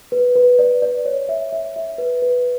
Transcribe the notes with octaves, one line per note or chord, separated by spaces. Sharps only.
B4
B4
D5
D5
C#5
E5
E5
E5
B4
B4